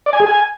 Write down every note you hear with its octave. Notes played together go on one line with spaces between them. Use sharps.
D5
G#5
G#4
G#5